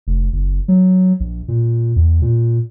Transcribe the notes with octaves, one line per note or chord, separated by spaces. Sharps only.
F1
F#1
F#3
A#1
A#2
E2
A#2